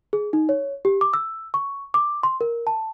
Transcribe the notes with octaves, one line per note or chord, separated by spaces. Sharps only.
G#4
D#4
C#5
G4
D6
E6
C#6
D6
C6
A#4
A5